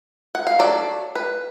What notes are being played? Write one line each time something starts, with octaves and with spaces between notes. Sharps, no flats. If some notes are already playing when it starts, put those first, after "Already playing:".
F#5
F5
F#3 A3 D4 D5
B4